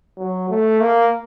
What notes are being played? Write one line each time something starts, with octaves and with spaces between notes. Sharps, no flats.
F#3
A3
A#3